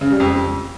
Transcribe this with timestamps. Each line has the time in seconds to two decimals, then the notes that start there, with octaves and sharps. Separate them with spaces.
0.01 C#3
0.10 G3
0.20 F2